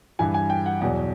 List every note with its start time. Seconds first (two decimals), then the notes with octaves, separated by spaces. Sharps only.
0.19 G2 E3 G#5
0.34 G#5
0.50 G5
0.66 F#5
0.81 E2 B2 F#3 F#5